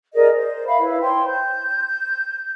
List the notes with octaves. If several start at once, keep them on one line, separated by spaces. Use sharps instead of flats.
G#4 A#4 D5 D#5
C5
E5 F5 B5
E4 B4 C#5
C5 C#5 G5 C6
G6